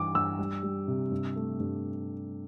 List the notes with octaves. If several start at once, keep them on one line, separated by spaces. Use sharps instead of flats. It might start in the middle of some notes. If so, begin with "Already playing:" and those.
Already playing: G2 E3 D6
G2 E6
G3
G3
C3
G2
A3
G2